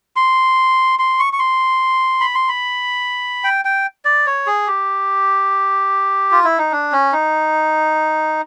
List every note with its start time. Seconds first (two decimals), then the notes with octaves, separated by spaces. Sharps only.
0.16 C6
0.99 C6
1.19 C#6
1.33 C#6
1.39 C6
2.21 B5
2.35 C6
2.49 B5
3.44 G5
3.65 G5
4.05 D5
4.26 C#5
4.47 G#4
4.67 G4
6.32 F4
6.44 E4
6.58 D#4
6.72 D4
6.92 C#4
7.12 D#4